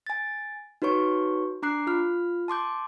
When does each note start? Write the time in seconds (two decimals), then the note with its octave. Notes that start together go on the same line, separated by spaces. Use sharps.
0.07 G#5 A6
0.82 D#4 F#4 B4 C#5 C#6
1.62 D4 A#5 D6 F#6 C7
1.87 F4 F6
2.48 A5 C6 D6 G6